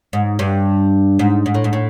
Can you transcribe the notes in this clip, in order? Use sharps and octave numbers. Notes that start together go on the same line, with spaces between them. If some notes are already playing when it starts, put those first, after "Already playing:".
G#2
G2
G#2
G#2
A2
G#2
A2